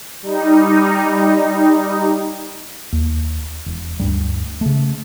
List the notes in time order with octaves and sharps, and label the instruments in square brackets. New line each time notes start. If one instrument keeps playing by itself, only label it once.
[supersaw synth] G3 D#4
[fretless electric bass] D#2
E1
D2 G2 G3
C#3 A3